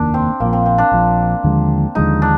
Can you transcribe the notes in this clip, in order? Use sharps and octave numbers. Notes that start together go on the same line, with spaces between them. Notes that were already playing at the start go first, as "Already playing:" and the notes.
Already playing: F1 D#2 D#3 A#3 D4
C4
A#1 A#2 F3 A#3
C4
C4
D4
A#1 A#2 F3
D#2 D3 F3 G#3
D#2 D3 F3 G#3 D#4
D4